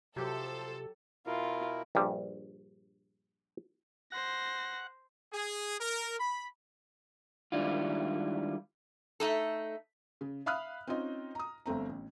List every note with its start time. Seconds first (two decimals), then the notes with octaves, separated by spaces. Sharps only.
0.16 C3 F3 F#3 G4 A4 C5
1.27 B2 E4 F4 A#4
1.95 A#1 G2 G3
4.12 C5 F#5 A#6
5.32 G#4
5.80 A#4
6.19 B5
7.52 D#3 G3 G#3 D4 E4 F4
9.20 A3 D#4 A4
10.21 C#3
10.46 E5 F5 B5 D#6 F6 F#6
10.87 C4 C#4 D#4 F4 D#5
11.35 A#5 D#6
11.66 G1 A3 C4 A#5
11.89 A1